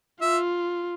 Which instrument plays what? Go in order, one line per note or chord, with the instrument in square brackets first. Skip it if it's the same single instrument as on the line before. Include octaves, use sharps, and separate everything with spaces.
[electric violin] F4 [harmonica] E5